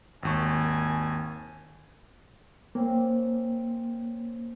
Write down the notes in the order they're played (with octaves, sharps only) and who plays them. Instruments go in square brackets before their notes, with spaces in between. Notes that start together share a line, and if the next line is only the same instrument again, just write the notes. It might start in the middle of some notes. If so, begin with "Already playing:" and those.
[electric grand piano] G#1 D#2 C#6 [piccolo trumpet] G#5
[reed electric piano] A#3 [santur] C4 C#4